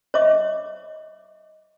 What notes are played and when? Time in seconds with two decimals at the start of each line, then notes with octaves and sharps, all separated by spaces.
0.14 C#5 D#5 E5 D6